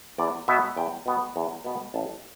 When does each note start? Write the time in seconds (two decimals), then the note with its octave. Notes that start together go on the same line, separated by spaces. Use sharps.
0.18 E2 D5
0.48 B2 B3 E5
0.77 E2 G5
1.06 B2 B3
1.36 E2
1.64 B2 B3
1.94 A1 A5